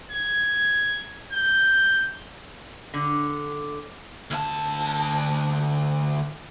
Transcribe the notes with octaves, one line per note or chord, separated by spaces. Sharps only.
G#6
G6
D3
D2 A5